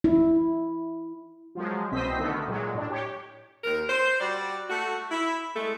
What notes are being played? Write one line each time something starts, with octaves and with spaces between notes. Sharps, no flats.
E4
F3 F#3 G#3
C2 B2 C4 C5 D#5 B6
D3 D#3 A3 B3
A#2 F#3 G#3
A2 D4
G4 C#5
D#2 A#4
C5
G3 F#4 D5
A3 F#4
E4
G#3 A3